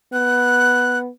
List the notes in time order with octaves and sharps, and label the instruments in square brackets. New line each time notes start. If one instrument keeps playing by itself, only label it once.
[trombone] B3 [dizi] F#6